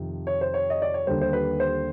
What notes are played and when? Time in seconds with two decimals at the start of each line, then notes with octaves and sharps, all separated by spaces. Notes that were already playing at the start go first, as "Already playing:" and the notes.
Already playing: F2 C3 D#3
0.27 C#5
0.41 C5
0.54 C#5
0.70 D#5
0.82 D5
0.94 C#5
1.07 D#2 D3 G3 C5
1.21 C5
1.33 B4
1.60 C5